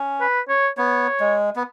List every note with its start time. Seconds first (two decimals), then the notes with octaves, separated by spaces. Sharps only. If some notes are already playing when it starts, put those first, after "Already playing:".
Already playing: C#4
0.21 B4
0.49 C#5
0.78 B3 C#5
1.20 G#3
1.56 B3